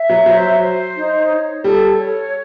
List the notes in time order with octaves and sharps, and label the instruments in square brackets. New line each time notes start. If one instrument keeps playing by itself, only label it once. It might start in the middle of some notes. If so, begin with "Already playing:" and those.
Already playing: [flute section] E5
[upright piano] F#3
[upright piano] F#3 [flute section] C5
[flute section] C5
D#4
C#5
[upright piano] G3 [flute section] A4
[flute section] C#5